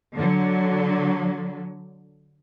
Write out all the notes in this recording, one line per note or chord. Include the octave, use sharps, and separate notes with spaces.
D3 F#3